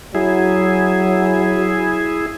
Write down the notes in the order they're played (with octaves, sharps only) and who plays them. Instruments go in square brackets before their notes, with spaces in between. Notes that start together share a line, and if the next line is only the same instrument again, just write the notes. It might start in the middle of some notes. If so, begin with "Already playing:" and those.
[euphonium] F#3 [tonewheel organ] E4 G#4